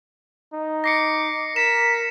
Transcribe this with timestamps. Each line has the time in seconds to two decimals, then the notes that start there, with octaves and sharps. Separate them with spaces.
0.53 D#4
0.84 D6 A#6 C7 C#7
1.56 A#4 B6 E7